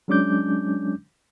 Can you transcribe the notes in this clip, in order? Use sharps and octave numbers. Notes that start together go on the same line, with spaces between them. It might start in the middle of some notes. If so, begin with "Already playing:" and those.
F#3 G#3 C#4 D4 D6 G6